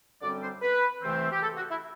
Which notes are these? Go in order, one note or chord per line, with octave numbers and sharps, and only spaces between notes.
F#2 D3 G3 C4 D5
C5
B4
C2 C3 E3 A3 C4
G4
A4
F#4
E4